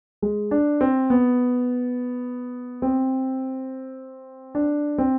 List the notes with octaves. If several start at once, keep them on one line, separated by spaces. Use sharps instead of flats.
G#3
D4
C4
B3
C4
D4
C4